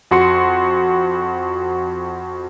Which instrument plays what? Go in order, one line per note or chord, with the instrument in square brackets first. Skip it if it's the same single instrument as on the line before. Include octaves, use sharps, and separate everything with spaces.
[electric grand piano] F2 F#4 C6 C#7